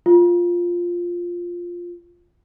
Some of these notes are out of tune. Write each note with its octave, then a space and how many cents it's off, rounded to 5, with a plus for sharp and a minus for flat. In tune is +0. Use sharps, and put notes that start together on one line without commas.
F4 +0